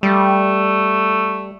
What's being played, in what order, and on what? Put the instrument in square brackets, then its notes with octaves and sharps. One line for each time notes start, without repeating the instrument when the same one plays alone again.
[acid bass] G3 [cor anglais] A3